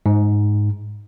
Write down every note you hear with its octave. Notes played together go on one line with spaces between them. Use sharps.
G#2